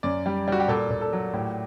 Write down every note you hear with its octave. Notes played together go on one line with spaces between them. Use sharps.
F#2 D5
G3
G3 F#4
G4
A#2 A4
A#2
A4
F#3
A2 G4